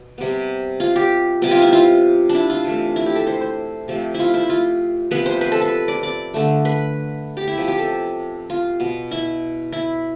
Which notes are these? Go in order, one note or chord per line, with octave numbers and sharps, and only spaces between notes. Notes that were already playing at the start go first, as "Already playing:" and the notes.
Already playing: B2
C3 G3 B3
F4
G4
C3 G3 B3 G4
F4
E4
F4
D4
E4
F4
C3 E3 A3
E4
G4
A4
C5
C5
C3 F3 A3
E4 F4
E4
F4
C3 F3 B3 B4
C5
B4
A4
B4
D5
D5
D3 A3
B4
G4
E4
C3 F3 B3
G4
A4
F4
B2 B3
E4
E4